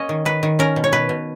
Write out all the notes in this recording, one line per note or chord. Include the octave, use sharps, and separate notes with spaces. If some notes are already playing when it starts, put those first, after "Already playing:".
Already playing: A#3 C#4 C#5 D#5
D#3
D#3 B4
D#3
C#4 A#4
B2
C#5
B2 B4
B2